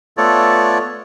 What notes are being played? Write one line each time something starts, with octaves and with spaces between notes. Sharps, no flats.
A3 B3 F4 A4 C#5 D5